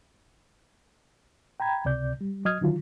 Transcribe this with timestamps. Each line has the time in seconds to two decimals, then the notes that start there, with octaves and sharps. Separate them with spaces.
1.60 G5 A#5 B5 G#6
1.85 C#2 C3 D5 G6
2.21 G3
2.45 F#3 D#5 D#6 F6 G#6
2.61 D3 D#3 F#3 F4